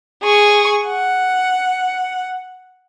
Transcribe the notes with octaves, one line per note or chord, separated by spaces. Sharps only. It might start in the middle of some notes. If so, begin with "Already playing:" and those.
G#4 C#6
F#5